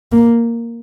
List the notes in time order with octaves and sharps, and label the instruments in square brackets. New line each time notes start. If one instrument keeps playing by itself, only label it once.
[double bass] A#3